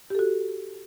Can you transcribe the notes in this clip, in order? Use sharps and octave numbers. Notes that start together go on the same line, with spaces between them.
F#4 G4 A4